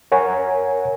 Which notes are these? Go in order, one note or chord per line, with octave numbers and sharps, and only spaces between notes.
A#4 C#5 F#5 G#5